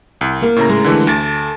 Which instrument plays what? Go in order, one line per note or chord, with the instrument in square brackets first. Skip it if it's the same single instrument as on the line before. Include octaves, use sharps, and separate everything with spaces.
[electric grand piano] C2
[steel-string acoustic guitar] A#3 A#4
[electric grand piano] A2 C#3 A#5
[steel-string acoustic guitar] G#3 A#4
[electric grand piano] D3 E3 A3
[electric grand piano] D2 A6 [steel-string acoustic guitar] A4